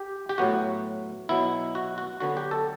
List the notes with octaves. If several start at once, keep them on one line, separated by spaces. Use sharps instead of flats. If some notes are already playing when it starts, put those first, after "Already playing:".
Already playing: G4
G4
A2 F#3 B3 F#4
B2 F#3 B3 E4
F#4
F#4
D3 F#3 B3 F#4
G4
A4